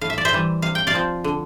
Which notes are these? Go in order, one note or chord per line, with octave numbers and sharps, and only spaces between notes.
A2 F5
E5
D5
C5 E5
E3 G3
C3 F5
G5
D5 F5
F3 C4
D3